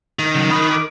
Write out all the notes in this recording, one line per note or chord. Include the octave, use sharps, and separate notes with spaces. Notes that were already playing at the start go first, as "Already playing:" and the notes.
D#3
C#3 F#3
A#4 B5 D#6
D6